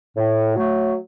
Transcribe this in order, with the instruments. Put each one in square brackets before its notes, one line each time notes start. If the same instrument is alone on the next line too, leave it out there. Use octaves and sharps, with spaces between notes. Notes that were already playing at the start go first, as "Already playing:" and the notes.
[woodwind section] A2
F#3 A3